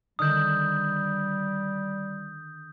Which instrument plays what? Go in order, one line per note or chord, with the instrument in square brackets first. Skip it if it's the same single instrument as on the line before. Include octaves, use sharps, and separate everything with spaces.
[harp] D3 D#3 F6 [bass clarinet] G3 [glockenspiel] D#6 G6